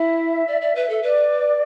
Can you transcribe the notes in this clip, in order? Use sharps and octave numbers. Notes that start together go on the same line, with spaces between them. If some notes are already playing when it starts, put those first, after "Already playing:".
Already playing: E4 E5
D5
D5
B4
A4
B4 D5